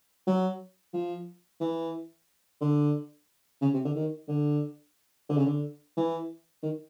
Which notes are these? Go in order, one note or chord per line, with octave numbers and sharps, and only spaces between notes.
F#3
F3
E3
D3
C#3
C3
D3
D#3
D3
D3
C#3
D3
E3
D#3